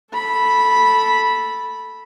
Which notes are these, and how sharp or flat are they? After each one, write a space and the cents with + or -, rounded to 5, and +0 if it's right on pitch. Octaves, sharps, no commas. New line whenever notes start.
A4 +0 B5 -10